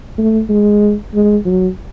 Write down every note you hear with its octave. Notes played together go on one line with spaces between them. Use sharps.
A3
G#3
G#3
F#3